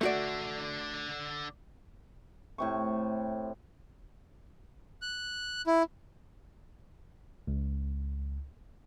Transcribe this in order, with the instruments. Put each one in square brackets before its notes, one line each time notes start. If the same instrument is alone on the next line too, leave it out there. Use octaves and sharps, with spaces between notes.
[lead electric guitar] D3 D4 [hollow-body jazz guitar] A3 F#4 D5
[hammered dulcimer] A2 C3 C#6
[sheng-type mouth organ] F#6
E4
[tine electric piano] C#2